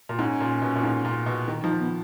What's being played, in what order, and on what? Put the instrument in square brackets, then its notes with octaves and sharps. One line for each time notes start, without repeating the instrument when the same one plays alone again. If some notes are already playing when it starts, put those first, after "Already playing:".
[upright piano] A#2
[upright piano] G#2 [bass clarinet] C#4
[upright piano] A#2
B2
A#2
G#2
A#2
B2
[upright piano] D#3 [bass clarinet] D#4
[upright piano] F3 [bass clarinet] D#4
[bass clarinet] B3